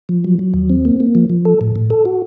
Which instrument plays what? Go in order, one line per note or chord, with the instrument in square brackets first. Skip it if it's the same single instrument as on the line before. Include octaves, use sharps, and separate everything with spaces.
[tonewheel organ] F3
F#3
F#3
D#2
C4
A#3
A#3
F3
F3
A4
A2
A2
A4
F#4